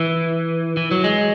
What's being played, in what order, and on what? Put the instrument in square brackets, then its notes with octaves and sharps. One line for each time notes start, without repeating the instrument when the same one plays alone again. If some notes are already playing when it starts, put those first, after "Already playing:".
Already playing: [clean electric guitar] E3
E3
F#3
G#3